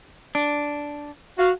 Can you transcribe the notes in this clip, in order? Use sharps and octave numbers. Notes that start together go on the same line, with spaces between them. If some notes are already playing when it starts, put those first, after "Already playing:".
D4
F#4 F5